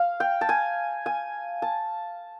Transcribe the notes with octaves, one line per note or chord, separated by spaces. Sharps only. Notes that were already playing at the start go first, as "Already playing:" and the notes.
Already playing: F5
G5
A5
G#5
G#5
A5